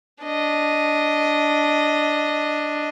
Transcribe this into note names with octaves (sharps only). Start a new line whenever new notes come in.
D4 D#5